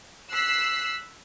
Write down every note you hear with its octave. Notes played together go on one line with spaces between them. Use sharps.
E6 F#6 B6 C7